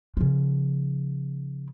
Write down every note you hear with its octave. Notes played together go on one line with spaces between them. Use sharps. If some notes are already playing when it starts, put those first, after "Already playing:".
C#3 F3